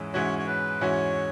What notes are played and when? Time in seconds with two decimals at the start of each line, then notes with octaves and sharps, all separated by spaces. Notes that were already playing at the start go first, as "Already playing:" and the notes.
Already playing: G#2 E3 C#4
0.14 G#2 E3 C#4 F#4 C#5
0.39 C#5
0.47 B4
0.81 G#2 E3 C#4 F#4 C#5